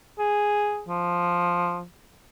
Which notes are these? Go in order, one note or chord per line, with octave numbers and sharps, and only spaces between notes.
G#4
F3